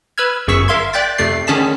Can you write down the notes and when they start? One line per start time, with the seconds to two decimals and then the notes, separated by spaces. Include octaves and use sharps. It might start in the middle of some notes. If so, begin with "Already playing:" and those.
0.18 B4 B5 E6 F6 G#6
0.47 G1 F#2 G#4 C#6 E6 B6
0.68 A#4 E5 F5 C6 G#6
0.93 D5 G5 F#6 G6 A6 B6
1.18 F2 C3 A3 D5 C7
1.47 D3 D#3 C#4 G#4 A5 B6